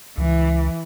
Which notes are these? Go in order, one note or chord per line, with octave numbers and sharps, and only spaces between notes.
C#2 E3